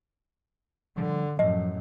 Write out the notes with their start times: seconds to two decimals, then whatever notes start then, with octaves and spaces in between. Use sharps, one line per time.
0.98 D3 F3 G3
1.39 F#2 A2 F3 D#5